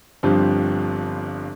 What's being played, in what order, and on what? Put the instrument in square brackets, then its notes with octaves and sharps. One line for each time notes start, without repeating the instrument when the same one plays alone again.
[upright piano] G1 G2 F3 C4 G4